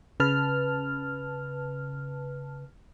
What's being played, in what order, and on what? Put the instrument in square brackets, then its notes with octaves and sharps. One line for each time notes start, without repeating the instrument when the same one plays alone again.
[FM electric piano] C#3 B4 A5 F6